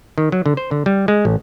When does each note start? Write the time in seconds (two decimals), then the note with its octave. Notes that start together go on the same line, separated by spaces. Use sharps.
0.18 D#3
0.32 F#3
0.46 D3
0.57 C5
0.71 D3
0.86 G3
1.08 G#3
1.25 A1